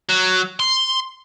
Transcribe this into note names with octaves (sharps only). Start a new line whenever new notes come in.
F#3
C6